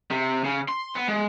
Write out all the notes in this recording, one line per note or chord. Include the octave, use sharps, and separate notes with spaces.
C3
C#3
C6
B3
G#3